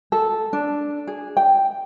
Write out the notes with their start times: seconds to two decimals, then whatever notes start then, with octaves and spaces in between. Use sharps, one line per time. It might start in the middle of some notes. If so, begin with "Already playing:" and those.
0.12 A4
0.53 D4
1.07 G#4
1.37 G5